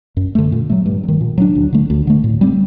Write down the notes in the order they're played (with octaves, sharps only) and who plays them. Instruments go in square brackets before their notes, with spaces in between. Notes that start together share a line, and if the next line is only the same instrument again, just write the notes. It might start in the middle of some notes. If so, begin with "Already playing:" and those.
[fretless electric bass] F#2
D3 A3
A#2
F#3 A3
G2
F#3
D#3
A#2
F#3 A#3 D4
D2
D3 A3
D2
D3 A3
A2
G3 C4